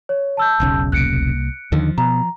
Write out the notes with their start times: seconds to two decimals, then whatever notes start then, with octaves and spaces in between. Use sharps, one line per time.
0.09 C#5
0.37 A5 E6 G6
0.60 E1 B1 C#3
0.92 C2 A#3 F#6 C#7 D7
1.72 D#2 D3 D#3 F3
1.98 B2 A#5